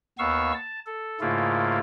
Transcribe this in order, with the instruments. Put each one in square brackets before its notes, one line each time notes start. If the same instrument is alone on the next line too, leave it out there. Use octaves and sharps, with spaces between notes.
[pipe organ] D#2 B3 F5 C#6 E6
A5
A4
G#2 C#3 A3 A#3 E4 F4